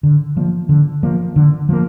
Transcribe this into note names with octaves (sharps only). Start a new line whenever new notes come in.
D3
F3 A#3
D3
F3 A#3
D3
F3 A#3